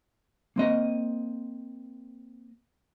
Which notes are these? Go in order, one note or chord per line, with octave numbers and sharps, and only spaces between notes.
A#3 C4 D#5